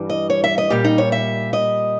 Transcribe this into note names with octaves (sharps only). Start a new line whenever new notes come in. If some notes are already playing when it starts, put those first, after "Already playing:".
Already playing: G2 E3 G3
D#5
C#5
E5
D#5
A#2 G3 G4
D#4
C#5
E5
D#5